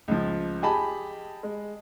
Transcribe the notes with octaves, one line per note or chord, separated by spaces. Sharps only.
C#2 F3
G4 G#4 D#5 A5 B5
G#3